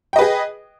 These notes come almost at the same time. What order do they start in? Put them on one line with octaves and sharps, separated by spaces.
G5 D#5 B4 G#4